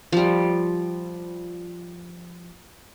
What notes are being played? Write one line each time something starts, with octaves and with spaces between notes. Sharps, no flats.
F3 G3